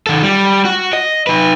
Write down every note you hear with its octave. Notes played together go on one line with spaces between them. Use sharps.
D#3 A4
G3
F#4
D#5
D#4 B4